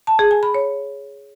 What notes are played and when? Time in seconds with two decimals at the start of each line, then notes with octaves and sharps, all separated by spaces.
0.07 A5
0.19 G#4
0.31 G#5
0.43 B5
0.54 C#5